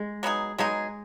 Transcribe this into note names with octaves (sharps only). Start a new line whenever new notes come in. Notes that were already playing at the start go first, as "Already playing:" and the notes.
Already playing: G#3
F#3 B3 D#4 G#4
F#3 G#3 B3 D#4 G#4